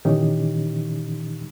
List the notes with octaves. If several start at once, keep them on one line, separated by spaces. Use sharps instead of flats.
A#2 D#3 E3 C#4 D#4 G4